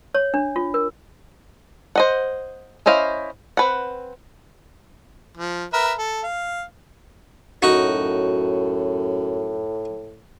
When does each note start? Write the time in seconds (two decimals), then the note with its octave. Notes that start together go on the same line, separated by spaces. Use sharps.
0.15 C#5
0.34 D4
0.56 F4
0.74 A#4
1.96 C5 D#5 F#5
2.86 C#4 E4 C5 D#5 F5
3.57 C4 B4 F#5
5.37 F3
5.73 A#4 B4 E5
5.98 A4
6.24 F5
7.62 F#2 A2 D#4 F#4